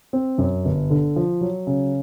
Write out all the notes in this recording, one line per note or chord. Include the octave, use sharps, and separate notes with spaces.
C4
F#2
G1
D3
F3
F#3
C#3